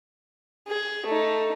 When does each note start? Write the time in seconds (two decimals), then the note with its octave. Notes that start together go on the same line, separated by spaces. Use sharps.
0.68 G#4
1.06 A3 D#4